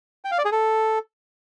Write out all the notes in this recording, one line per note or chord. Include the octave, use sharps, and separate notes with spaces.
G5
F5
D5
G#4
A4